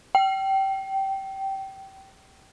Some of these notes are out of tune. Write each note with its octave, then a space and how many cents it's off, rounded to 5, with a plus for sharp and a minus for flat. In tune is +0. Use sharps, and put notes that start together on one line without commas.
G5 -20